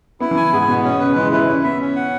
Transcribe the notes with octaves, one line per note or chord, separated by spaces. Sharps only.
B3 E4
E3
G#5
G#2 B3
B2 B3
B2 C#4
C#3 B4
E3 G#3
E4 B4
C#4 E4
B3 E5
C#4
F#5